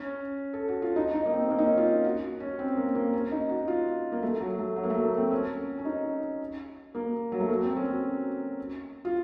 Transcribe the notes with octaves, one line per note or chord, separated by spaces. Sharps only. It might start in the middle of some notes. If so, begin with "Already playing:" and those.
Already playing: C#4
A4
F#4
F4
D#4
D#4
A#3
C4
A#3
D#4
C#4
F4
F#4
C#4
C4
A#3
A#3
C#4
D#4
F#4
F4
A#3
A3
F#3
A3
F#3
A#3
A3
A#3
C4
C#4
C#4
D#4
A#3
F#3
A3
A#3
C4
C#4
F#4
F4